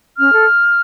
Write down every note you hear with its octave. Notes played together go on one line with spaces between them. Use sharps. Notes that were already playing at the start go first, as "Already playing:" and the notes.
C#4 F6
A4